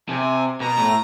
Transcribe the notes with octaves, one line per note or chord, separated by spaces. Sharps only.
C3 G#5
B2 A#5
A2